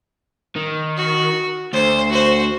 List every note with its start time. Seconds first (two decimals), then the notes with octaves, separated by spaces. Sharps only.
0.56 D#3
0.97 F#4
1.73 D2 C5
2.10 F#4 C5